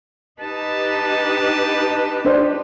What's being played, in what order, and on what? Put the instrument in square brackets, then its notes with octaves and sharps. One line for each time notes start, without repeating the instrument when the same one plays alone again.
[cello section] D#4 G4 B4 [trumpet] A5
[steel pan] D4 C5 D5